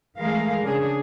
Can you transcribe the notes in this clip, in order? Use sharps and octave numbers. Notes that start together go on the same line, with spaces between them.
E3 G#3 A3 G#4 A#4 F5
C#3 D4 G#4